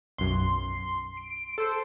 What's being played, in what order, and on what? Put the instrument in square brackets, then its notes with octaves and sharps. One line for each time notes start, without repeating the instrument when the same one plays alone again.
[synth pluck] B1 F#2 [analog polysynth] C6
[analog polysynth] D7
A4 C5